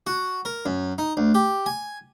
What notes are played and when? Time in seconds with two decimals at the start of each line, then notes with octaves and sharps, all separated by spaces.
0.07 F#4
0.45 A#4
0.66 F#2
0.98 D#4
1.17 D2
1.34 G4
1.66 G#5